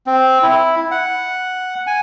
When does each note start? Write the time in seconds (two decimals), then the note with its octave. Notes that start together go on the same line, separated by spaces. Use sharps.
0.07 C4
0.42 E4
0.91 F#5
1.87 G#5